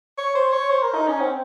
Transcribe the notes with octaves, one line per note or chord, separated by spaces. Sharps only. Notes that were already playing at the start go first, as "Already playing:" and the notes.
C#5
C5
C#5
C5
A#4
D#4
C#4
C4